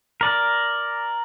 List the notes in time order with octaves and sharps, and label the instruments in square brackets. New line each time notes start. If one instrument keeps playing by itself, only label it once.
[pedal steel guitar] A#4 D5